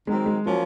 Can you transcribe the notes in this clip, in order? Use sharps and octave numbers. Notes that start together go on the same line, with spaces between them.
D#3 F#3 G#3 C4
G#3
F3 F#3 A#3 C#4